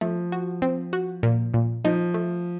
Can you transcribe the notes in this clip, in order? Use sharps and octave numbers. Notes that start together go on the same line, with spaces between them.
F3 A3
F#4
C4
F#4
A#2
A#2
F3 D#4
A3